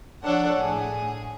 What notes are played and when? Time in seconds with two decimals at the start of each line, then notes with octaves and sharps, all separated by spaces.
0.24 F3 D4 A4 C#5 F#5
0.56 A2 G#4